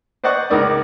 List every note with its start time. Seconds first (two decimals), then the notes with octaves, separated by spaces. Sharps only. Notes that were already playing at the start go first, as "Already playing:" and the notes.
0.24 C5 D5 D#5 F#5 C#6
0.50 C#2 D#4 A#4 D5 D#5